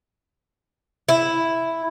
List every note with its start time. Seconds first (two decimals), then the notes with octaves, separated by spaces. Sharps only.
1.09 E4